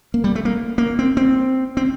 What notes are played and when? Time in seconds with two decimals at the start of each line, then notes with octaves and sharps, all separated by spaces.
0.14 A#3
0.24 G3
0.35 A3
0.45 A#3
0.78 A#3
0.99 C4
1.17 C4
1.77 C4